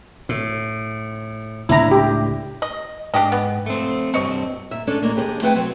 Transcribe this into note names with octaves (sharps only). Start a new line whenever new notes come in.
A2
C#2 A2 D4 E4 A#5
G4
D#5
G#2 D4 G4 D#5
B3
A3 C4
G2 C4 C#5 D#5
A#2 E5
G#3 C#4 D4 A4 D5
A#2 G#3 A#3
D#2 D4 G4 G#4 C5 D#5
A3 C4 G#4 B4 F#5 G5
C3 F#3 C4